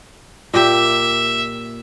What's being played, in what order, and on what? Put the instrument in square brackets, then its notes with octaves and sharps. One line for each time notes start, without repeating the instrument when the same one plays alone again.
[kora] A#2 G4 [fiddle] E5